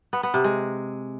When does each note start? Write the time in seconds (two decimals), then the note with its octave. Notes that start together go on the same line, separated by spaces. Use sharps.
0.13 B3
0.23 B3
0.34 C3
0.44 G#3